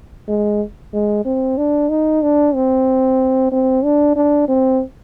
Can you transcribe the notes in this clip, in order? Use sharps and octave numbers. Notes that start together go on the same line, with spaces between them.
G#3
G#3
C4
D4
D#4
D4
C4
C4
D4
D4
C4